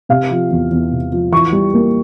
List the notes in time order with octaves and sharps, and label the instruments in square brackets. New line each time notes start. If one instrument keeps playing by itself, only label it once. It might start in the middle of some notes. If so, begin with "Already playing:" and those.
[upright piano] C3 F5
F3
E2
E2
C3
F3
E3 C#6
G3
A#3